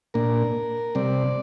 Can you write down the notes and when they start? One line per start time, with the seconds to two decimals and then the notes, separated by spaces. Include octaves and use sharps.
0.14 A#2 A#3 D4 A#4
0.95 C3 G3 C4 D5